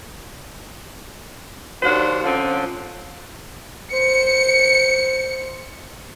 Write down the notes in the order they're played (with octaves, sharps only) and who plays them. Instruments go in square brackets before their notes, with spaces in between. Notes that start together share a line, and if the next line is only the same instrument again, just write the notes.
[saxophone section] D#2 F#3 D4 C5 F#5
D3 F3 C4 C#4
[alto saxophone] C5 [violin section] C#7